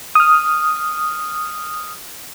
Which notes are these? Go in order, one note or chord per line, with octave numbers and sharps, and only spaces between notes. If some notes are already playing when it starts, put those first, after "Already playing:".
D#6 F6